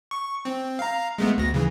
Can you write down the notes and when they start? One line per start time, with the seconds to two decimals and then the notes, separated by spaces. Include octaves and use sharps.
0.11 C#6
0.45 C4
0.79 F5 A#5
1.18 G#3 A3 B3
1.38 D2 A#6
1.54 C#3 E3